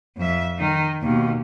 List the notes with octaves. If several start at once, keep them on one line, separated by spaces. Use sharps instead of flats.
F2 E5
D#3 D#4
D#2 B2